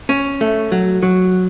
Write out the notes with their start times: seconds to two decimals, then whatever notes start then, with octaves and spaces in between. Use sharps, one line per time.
0.09 C#4
0.41 A3
0.72 F#3
1.03 F#3